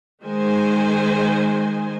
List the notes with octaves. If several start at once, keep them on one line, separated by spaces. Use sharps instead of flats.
D#3 G#3 C5 G#5